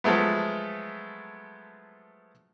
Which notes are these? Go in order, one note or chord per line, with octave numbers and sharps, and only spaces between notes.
F3 F#3 G#3 A3 B3